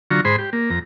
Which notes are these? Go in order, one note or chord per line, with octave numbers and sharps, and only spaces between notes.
D3 F#3 F4 A#5 C#6
G#2 G#4 C5 B5 C6
G4
A#3
F2 A#5